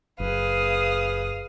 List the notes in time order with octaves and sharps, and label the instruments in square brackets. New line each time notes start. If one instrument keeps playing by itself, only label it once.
[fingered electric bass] F#1 [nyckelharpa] G#4 B4 [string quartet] F5 D#6